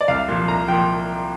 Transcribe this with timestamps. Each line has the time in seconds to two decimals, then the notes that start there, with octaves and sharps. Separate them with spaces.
0.01 D5
0.08 C2 F5
0.28 A#2 F3
0.48 C2 A#5
0.68 A#2 F3 G5